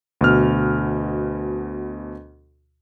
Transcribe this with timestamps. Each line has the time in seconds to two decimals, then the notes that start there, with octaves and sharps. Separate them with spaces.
0.21 D2 B2 F6